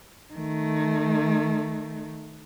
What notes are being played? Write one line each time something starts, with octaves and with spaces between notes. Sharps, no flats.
D#3 A3